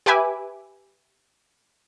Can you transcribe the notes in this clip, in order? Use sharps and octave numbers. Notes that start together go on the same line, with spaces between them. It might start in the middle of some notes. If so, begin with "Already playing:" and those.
G4 B4 E5 G#5 B5 D6